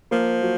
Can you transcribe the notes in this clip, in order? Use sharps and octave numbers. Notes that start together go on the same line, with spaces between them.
F3 A#3
F#3